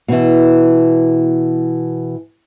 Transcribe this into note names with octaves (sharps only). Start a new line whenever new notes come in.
B2 E3